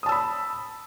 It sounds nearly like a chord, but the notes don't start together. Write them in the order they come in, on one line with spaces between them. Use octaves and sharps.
D#6 A5 E6 B5